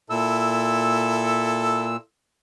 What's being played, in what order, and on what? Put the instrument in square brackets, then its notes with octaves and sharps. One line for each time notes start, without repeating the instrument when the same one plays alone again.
[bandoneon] A#2 E6 [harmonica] E4 A4